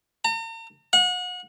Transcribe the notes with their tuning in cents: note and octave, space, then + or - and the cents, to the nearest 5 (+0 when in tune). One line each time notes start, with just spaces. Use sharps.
A#5 -45
F#5 -35